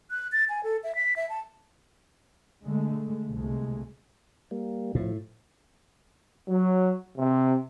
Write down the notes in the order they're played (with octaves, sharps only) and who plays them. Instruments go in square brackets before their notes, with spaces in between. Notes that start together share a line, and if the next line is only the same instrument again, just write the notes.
[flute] F#6
A6
G#5
A4
E5
B6
E5
A5
[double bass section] D3 G#3 A3
C2 B2 G#3 A3
[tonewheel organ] G3 A#3
[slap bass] A2 [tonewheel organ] F3
[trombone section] F#3
C3